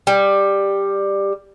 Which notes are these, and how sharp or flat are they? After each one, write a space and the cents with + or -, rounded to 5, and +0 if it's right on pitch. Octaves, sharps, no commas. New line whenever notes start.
G3 +10